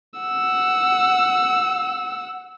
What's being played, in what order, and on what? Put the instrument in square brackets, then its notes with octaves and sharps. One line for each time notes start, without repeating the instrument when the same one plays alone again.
[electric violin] F#5 E6